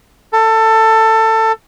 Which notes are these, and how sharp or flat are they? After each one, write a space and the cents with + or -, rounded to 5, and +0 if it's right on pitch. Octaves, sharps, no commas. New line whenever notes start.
A4 +20